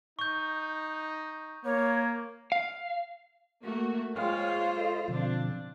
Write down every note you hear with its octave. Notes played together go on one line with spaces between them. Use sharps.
D#4 C#6 G6
A#3 C#5
F5
A3 A#3 F#4
G#3 F4 C5 C#5 F5 G5 F6
A4 D#5
B2 D3 F3 C4 D4